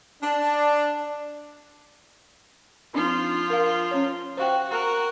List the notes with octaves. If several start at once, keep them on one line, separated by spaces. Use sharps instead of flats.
D4
F3 C4 D4 D#4 F4
A#4 F5
C#4 C#5
F#4 C5 F5 G5
F#4 A#4